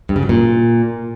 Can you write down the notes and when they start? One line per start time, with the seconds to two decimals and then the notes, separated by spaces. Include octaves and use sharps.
0.09 G2
0.16 C#3
0.23 F#3
0.29 A#2